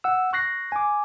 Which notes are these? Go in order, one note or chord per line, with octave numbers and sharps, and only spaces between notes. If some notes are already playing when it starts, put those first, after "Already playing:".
F#5 E6
C#6 F#6 A#6 C7
G#5 D6